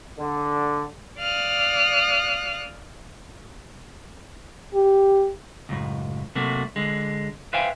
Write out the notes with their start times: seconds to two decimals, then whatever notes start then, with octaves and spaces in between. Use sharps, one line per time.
0.19 D3
1.20 D5 F5 D#6 F6 F#6
4.74 G4
5.69 C#2 F#2 A2
6.35 C3 F#3 A3 A#3 F#4
6.76 D3 G#3
7.53 B4 C5 E5 F5 G5 G#5